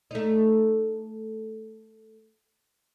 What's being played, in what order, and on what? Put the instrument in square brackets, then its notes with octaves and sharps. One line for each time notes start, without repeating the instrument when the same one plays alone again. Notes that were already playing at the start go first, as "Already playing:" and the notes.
[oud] A3 D#4